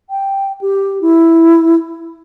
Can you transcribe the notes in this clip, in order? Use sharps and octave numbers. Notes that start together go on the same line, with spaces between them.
G5
G4
E4